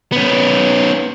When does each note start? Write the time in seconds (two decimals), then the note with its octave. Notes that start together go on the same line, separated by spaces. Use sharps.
0.12 B3 C#4